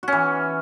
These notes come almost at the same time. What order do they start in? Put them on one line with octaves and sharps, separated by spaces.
F#4 C#4 E3